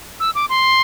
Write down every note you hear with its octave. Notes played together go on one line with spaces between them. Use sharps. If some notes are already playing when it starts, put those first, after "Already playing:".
E6
D6
C6